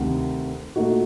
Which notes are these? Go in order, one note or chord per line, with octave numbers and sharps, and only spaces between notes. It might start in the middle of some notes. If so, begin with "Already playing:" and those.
Already playing: D2 C3 D#3
A#2 A3 D#4 F#4